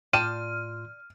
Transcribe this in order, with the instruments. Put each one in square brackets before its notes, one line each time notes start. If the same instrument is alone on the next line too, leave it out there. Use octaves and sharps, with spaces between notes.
[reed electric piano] A2 F4 C6 [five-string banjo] D5 G5 A5 [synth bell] F6 [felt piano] D#7